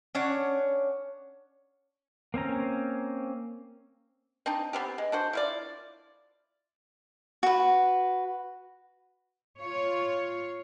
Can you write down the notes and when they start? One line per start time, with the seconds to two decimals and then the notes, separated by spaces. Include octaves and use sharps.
0.15 C#4 D4 C#5 F#5
2.34 A#3 C4 C#4 A#5
4.46 C4 D4 D#4
4.73 B3 C4 G4
4.98 G#3
5.12 D4 F#4 C5
5.33 E4 F4 D5
7.43 F#4 B4
9.59 F4 C#5